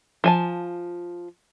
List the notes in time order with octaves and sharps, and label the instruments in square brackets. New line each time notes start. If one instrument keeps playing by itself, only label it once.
[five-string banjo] F3 G#5 A5